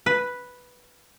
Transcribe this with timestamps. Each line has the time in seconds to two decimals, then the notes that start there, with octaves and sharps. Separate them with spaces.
0.06 B4